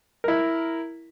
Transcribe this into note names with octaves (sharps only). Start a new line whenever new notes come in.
E4 A#4